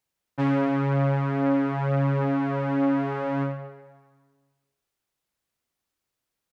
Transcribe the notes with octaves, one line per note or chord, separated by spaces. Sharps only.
C#3